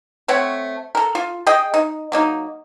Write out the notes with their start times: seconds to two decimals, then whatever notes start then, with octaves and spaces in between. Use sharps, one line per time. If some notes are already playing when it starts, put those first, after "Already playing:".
0.28 A3 C4 C#5 F#5
0.95 A4 A#4
1.15 F4
1.47 G#4 D#5 G5
1.74 D#4
2.12 F#3 A#3 D#4